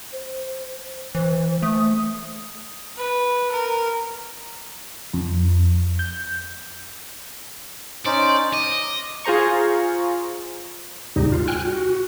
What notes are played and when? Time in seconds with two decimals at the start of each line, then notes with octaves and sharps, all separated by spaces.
0.13 C5
1.15 E3 C5
1.62 A3 D#6
2.97 B4
3.51 A#4
5.13 F2
5.99 G6
8.06 C#4 D#4 C5 D5
8.53 D#5 D6
9.24 F4 G#4 C5 A#5 C#6
11.16 D#2 G#2 C3 G3 D#4
11.32 F4
11.48 G5 G#5 F6 F#6
11.67 F#4